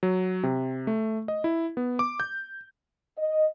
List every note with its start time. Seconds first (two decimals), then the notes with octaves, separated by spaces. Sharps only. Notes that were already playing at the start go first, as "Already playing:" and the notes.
0.03 F#3
0.43 C3
0.87 A3
1.28 D#5
1.44 E4
1.77 B3
1.99 D6
2.20 G6
3.18 D#5